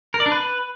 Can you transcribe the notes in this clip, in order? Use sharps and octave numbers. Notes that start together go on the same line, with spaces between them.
A#4
D5
D4
B4